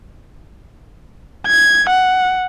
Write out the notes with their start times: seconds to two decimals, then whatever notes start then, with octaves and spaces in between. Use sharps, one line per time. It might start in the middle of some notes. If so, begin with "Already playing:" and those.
1.47 G#6
1.90 F#5